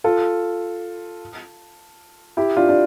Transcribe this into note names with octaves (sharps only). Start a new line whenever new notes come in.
F4 A4
E4 G4
D4 F4
D4